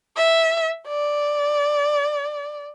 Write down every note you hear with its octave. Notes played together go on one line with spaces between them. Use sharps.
E5
D5